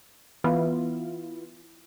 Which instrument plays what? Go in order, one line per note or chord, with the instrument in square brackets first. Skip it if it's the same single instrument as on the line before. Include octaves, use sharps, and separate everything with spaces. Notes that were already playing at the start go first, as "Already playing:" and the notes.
[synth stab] E3 B3 E4 F4